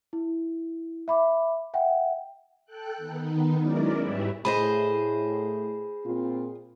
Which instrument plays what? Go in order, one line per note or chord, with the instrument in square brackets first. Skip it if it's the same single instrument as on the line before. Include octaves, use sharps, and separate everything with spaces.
[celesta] E4
E5 B5 D6
E5 F#5 G5
[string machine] A4 G5 F#6
D#3 B3 D#4
F#3 G#3 C#4 E4 A#4 D5
G#2 G3 G4 B4 C#5 E5
[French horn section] A2 [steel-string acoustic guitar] G#4 C5 D#5 [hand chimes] B5
[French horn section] A#2 C4 F4